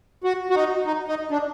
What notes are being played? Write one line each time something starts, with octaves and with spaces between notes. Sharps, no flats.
F#4
F#4
D#4
D#4
D#4
D4